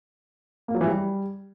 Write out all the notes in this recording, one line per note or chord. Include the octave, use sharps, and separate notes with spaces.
A#3
F#3
E3
G3